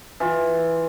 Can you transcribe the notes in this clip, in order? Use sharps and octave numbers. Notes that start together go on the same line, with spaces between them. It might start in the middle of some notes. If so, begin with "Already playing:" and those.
E3 F4